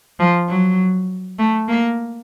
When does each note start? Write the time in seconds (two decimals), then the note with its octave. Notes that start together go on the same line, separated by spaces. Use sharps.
0.19 F3
0.49 F#3
1.39 A3
1.69 A#3